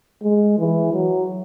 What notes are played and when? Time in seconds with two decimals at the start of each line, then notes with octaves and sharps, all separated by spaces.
0.23 G#3
0.58 E3
0.93 F#3